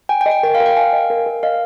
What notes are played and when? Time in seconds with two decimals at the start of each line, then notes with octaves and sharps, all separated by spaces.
0.09 G5 G#5
0.21 G5
0.26 D#5
0.31 G5
0.43 A#4 G5
0.55 F5
0.60 A#4
0.66 G5
0.77 F5 G#5
0.93 D#5
1.10 A#4
1.26 A#4
1.43 D#5 F5